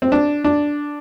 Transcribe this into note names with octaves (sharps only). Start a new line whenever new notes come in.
C4
D4
D4